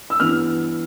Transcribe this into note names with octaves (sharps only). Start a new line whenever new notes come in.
E6
G2 E3 B3 D4 F6